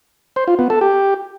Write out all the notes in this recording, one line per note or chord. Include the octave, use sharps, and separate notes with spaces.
C5
F4
B3
A4
G4